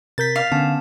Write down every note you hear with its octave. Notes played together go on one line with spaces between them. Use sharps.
C3 A#4 G6 A6 B6
F5
D3 B3 C#4 A5